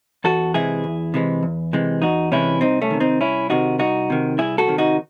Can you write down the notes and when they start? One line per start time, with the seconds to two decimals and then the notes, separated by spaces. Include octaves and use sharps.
0.24 E2 F#4 A4
0.54 C3 E3 G#3 E4 G#4
0.84 E2
1.14 C3 E3 G#3
1.43 E2
1.73 C3 E3 G#3
2.02 E2 D#4 F#4
2.32 C3 E3 G#3 C#4 E4
2.61 C2 C4 D#4
2.82 A3 C#4
2.90 C3 D#3
3.00 C4 D#4
3.20 C2 C#4 E4
3.50 C3 D#3 D#4 F#4
3.79 C2 D#4 F#4
4.10 C3 D#3
4.39 C2 E4 G#4
4.58 F#4 A4
4.68 C3 D#3
4.78 D#4 F#4